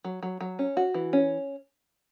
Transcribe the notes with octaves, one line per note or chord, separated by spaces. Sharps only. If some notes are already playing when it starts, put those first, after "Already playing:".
F#3
F#3
F#3
C#4
F#4
E3
C#4